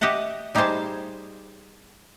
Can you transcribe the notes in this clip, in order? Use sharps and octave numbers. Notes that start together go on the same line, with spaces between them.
G4 D#5 E5 F#5 A5
G3 D#4 G4 G#4 C5 A5